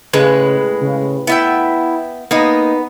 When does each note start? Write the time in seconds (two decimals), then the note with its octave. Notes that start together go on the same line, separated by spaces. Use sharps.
0.13 A2 C#3 G#3 B4
0.81 C#3
1.27 B3 E4 E5 G5
2.31 A#3 B3 D#4 D#5